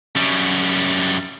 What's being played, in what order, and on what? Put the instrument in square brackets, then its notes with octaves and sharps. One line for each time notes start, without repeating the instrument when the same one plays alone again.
[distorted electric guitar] F#2 G3